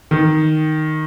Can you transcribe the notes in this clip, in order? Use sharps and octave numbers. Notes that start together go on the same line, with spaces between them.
D#3